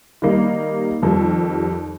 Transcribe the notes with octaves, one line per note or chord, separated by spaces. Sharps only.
D#3 G3 A#3 D#4
F2 D#3 G3